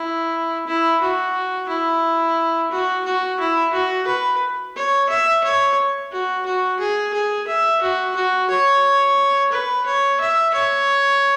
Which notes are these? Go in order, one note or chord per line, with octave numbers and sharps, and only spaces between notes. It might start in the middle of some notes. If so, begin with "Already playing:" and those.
Already playing: E4
E4
F#4
E4
F#4
F#4
E4
F#4
B4
C#5
E5
C#5
F#4
F#4
G#4
G#4
E5
F#4
F#4
C#5
B4
C#5
E5
C#5